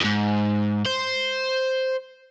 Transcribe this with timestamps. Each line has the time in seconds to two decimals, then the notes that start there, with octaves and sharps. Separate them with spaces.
0.01 F2 G#2
0.86 C5